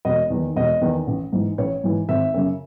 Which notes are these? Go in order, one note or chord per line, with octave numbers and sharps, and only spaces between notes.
E1 D#5
E2 D#3
E1 D#5
E2 D#3
A1
G#2 E3
A1 C#5
G#2 E3
G#1 E5
F#2 C#3